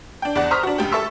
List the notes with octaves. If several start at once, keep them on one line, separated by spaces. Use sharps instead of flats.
D4 G5
E2 D5 F#5
C5 A#5 C#6 D#6 F6 B6
D4 F#4
F1 C#2 G4
A4 E5 C#6 E6